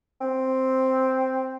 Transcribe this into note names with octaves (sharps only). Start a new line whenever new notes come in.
C4